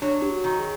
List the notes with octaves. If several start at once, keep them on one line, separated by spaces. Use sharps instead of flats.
F#3 D4
G4
F#4
D#3
G#4